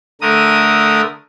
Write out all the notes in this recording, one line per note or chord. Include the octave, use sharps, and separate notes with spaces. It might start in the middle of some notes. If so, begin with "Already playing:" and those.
D3 A3 A#4 D#6